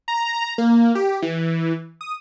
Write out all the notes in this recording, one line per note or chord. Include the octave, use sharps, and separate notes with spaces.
A#5
A#3
G4
E3
D#6